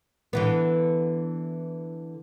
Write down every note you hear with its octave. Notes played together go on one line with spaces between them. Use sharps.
D3 E3 B3